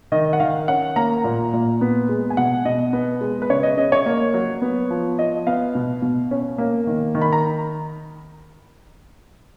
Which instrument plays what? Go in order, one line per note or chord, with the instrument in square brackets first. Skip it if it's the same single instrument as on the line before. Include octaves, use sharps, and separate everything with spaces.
[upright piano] D#3 D#5
F#5
D#3 F5
C#4 F#5
A#3 A#5
A#2
A#2
B3
G#3
G#5
B2 F#5
B2 D#5
B3
G#3
B4
C#3 C#5
D#5
C#3 D#5
C#5
A#3
F#3
B3
F3
F3 D#5
B3 F5
B2
B2
C#4
A#3
D#3
D#3
B5
A#5